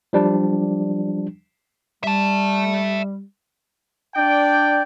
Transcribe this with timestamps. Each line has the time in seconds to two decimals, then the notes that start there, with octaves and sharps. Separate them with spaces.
0.13 F3 G3 D4
2.04 G3 E5 A5
4.15 D4 D5 G5